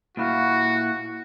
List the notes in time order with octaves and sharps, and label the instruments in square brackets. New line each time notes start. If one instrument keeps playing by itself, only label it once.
[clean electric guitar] A#2 E4 F5 [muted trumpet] F#4